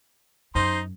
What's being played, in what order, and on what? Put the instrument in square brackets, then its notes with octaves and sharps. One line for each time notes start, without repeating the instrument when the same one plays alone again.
[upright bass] F#2 [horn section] D#4 C5 C6